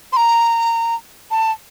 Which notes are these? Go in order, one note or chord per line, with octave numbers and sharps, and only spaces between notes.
C6
A#5
A5